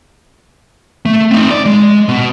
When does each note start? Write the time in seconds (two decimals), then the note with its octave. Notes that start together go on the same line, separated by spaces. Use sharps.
1.05 A3
1.31 C4 D#4
1.51 D5
1.66 G#3
2.09 B2